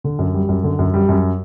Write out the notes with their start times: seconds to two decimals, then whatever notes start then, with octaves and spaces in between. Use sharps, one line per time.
0.04 D3
0.19 F#2
0.34 G3
0.49 F#2
0.64 D3
0.79 F#2
0.94 G3
1.09 F#2